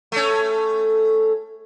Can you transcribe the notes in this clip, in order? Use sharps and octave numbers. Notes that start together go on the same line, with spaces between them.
A3 C#4